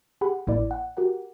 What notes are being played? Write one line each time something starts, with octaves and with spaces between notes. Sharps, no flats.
G4 G#4 F#5 B5
A1 A2 A#3 E4 D5
F#5
F#4 G4 A#4 F#5